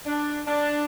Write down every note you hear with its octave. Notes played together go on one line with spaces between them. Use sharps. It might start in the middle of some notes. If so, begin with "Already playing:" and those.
D4
D4